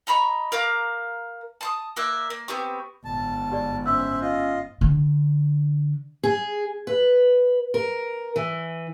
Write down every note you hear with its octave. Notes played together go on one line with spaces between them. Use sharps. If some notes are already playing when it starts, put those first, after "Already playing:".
D#5 A#5 B5 C#6
A#4 F5 A#5 D6
A5 C6 D#6
A#3 D5 E5 F#6
A#3
B3 C4 G4 C#6
G1 G#2 A5
G4 D5
C#4 C5 E5 E6 F#6
F4 D#5
D3
G#4
B4
A#4
E3